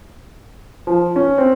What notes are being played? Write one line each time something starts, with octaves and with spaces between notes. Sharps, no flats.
F3
C#4
C4